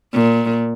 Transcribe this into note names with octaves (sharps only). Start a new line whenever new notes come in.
A#2